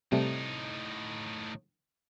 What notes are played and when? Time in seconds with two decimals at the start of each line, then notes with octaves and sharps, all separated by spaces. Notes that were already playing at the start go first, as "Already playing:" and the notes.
0.12 A2 C3 G3 A3 D#4